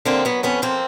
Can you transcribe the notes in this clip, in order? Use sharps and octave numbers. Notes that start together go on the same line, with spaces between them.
D3 A#3 C4
F#3 B3
F2 B3 C#4
F2 A#3 C4